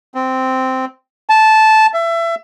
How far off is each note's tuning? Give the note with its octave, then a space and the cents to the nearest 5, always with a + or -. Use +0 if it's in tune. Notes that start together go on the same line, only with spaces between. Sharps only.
C4 -10
A5 -10
E5 +25